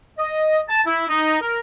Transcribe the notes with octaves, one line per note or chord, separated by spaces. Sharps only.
D#5
A5
E4
D#4
A#4